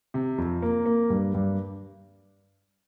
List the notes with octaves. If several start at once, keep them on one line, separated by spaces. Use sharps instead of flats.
C3
F2
A#3
A#3
G2
G2